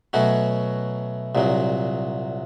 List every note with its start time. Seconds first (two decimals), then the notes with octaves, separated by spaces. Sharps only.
0.13 B2 F#3 A3 C#4 F#4
1.35 C2 A#2 F#3